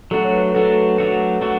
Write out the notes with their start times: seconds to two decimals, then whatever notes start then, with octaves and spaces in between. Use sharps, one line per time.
0.11 F#3 A3 D4 F#4 A4
0.24 C#5
0.33 B4
0.54 F#3 A3 D4 F#4 A4
0.77 B4
0.98 F#3 A3 D4 F#4
1.41 F#3 A3 D4 F#4